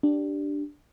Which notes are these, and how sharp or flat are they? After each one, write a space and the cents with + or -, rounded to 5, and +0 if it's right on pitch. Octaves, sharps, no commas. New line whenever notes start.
D4 +0 G4 +0